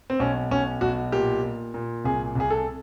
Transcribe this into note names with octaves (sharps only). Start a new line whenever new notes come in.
C4
B1 C#4
B1 C#4
B1 F#4
A#2 G4
A#2
A#2
C2 G#4
C2 G#4
A4